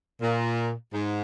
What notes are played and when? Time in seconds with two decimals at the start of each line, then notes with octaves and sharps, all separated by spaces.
0.21 A#2
0.93 G#2